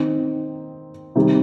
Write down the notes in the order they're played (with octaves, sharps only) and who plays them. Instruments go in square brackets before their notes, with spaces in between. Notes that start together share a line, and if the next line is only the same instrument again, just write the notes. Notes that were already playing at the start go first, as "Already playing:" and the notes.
Already playing: [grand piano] D#3 C4 D#4
C3 D#3 G3